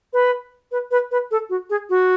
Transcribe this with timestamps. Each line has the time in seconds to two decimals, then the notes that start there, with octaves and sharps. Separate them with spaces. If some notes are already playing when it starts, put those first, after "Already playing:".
0.13 B4
0.72 B4
0.91 B4
1.11 B4
1.31 A4
1.50 F#4
1.70 G#4
1.90 F#4